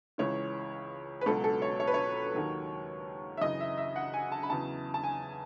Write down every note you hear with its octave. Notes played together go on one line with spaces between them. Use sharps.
C#2 C#3 E3 C#5
B4
C#2 B2 F#3 A4
A4
C#5
C#5
B4
C#5
D#2 D#3 F#3
E5
F#2 C#3 E3 D#5
E5
E5
F#5
G#5
A5
B5
E2 C#3 F#3 A5
A5
G#5